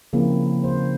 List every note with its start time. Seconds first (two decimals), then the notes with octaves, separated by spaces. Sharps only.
0.13 C#3 F3 A#3 C4 E4
0.64 C#3 C5